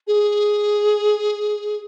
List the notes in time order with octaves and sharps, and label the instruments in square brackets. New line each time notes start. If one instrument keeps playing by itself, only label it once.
[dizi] G#4